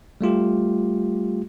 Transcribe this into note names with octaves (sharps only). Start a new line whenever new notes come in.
G3 A3 F4 G4